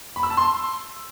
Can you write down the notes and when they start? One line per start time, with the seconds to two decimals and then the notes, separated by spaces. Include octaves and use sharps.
0.16 B5
0.23 E6
0.30 A5
0.37 C6